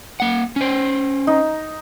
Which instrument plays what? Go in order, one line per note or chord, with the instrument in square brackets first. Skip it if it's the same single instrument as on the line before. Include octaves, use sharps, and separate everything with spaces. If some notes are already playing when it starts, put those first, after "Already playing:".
[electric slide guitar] A#3 F#5
C#4 C5
[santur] D#4